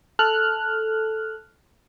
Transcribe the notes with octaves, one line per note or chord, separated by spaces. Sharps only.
A4 F6 F#6